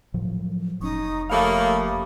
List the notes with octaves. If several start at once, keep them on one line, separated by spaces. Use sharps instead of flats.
A2 F3 F#3
F1 C#4 D#4 C#6 D#6
F2 A3 A#3 G4 C#5 F5 B5 D#6